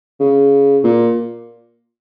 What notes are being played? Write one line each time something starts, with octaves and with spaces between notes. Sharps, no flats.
C#3
A#2